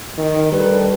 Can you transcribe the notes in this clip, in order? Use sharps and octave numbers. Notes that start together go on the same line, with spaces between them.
D#3
D2 G3 A4 B4